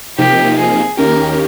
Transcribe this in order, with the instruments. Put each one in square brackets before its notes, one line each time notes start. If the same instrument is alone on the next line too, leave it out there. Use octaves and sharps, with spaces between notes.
[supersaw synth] C3 F3 A#3 D#4 [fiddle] G4
[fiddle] G#4
[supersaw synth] D#2 D#3 A#3 C#4 G4 [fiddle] A#4